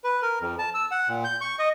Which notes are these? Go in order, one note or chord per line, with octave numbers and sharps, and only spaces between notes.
B4
A#4
F2
A5
E6
F#5
A#2
G6
C#6
D#5